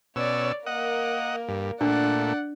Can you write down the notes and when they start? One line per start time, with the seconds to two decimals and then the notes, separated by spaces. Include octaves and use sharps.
0.16 B2 C#4 C#5 D5 E6
0.66 A#3 A#4 D#5 F#5
1.49 G2
1.81 A#2 A3 D4 D5 F#5